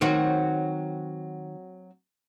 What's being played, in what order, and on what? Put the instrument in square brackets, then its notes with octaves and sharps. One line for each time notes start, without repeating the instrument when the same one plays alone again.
[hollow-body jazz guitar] D#3 [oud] F#3 C4 F#4